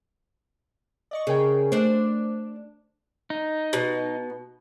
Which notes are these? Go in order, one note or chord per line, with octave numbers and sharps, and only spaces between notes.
D5 D#5 C#6
C#3 G#4 A#4 G5
A3 D4 C5
D#4
B2